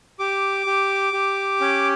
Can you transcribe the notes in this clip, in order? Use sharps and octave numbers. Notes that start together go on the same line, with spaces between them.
G4 D6
G4
G4
C#4